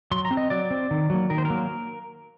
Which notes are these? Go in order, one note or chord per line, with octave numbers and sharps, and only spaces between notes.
F#3 C6
A#5
C4
D#5
F#3 D5
C4
D#3
F#3 A#3
D#3 A#4
C5
F#3 A#3 A#4